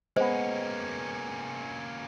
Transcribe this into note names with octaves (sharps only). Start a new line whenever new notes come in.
G#3 A#3 B3 C#4 C5